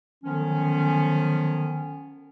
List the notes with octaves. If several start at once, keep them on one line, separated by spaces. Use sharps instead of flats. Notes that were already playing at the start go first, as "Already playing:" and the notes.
D3 D#3 F3 F#3 B3 C#4